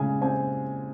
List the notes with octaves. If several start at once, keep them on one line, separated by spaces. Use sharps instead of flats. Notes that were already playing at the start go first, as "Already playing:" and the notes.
Already playing: A#2 C#3 G#3 G#5
C4 G#5